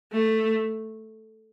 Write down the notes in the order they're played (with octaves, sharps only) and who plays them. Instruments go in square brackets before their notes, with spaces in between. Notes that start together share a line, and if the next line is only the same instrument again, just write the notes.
[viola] A3